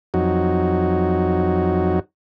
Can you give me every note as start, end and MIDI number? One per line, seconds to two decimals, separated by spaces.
0.14 1.99 41
0.14 1.99 54
0.14 1.99 63
0.14 1.99 66